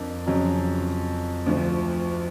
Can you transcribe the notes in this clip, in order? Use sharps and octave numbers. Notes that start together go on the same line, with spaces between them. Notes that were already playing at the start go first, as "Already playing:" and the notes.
Already playing: F2 A#3 D4
F2 C#3 F#3
D2 D3 F3